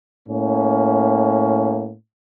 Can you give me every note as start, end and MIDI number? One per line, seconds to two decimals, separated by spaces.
0.27 1.93 45
0.27 1.93 58
0.27 1.93 61